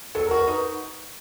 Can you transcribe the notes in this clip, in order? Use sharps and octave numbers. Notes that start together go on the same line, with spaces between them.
F#3 A4
A#4
F#4
B4
D#4